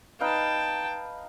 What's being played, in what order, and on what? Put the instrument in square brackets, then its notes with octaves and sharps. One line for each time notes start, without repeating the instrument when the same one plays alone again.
[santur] D#4 B4 F5 [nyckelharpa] G5 A5